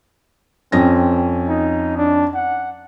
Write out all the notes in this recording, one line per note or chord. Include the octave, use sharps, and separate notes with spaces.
F2 C4 C#4 A#6
D#4
D4
F#5